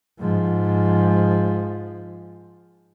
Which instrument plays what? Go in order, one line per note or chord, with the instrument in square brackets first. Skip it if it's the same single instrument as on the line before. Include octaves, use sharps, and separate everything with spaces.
[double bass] G#2 F3